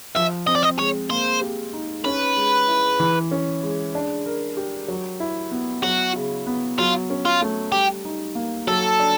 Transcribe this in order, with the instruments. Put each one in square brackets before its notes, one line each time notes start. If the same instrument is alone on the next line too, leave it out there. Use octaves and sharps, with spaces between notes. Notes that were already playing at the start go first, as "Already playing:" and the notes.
[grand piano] F3 [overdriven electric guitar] E5
[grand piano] C4 [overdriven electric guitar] D#5
[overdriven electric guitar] D5
D#5
[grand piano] G#3 [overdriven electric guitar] C#5
[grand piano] A#3 [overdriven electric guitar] C5
[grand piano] G4
D#4
[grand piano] C#4 [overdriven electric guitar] B4
[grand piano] G#3
E4
E3
C#4
G#3
D4
A#4
G4
F#3
E4
B3
[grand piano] F#3 [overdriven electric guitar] F#4
[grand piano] C#3
B3
[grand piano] F#3 [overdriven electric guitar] F4
[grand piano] C#4
[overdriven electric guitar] F4
[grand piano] A3
[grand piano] G3 [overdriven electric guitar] G4
[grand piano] D#4
A#3
[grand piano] F#3 [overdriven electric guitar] A4
[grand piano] D4